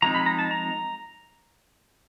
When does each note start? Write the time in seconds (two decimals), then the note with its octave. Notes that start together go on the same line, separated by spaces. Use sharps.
0.02 F3 G#3 C4 D#4 A#5
0.15 B5
0.26 A#5
0.39 A5
0.51 A#5